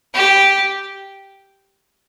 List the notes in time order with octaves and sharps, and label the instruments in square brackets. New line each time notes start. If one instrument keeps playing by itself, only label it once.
[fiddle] G4